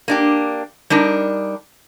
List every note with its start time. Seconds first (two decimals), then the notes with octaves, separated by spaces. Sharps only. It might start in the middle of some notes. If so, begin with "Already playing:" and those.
0.08 A#3 D4 G4
0.90 G3 D4 D#4 A#4